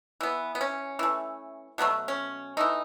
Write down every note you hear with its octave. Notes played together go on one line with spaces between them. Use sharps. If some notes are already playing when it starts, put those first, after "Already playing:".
E3 B3
B3
C#4
E3 A3
B2 F#3 A3 B3
C#4
E3 A3 D#4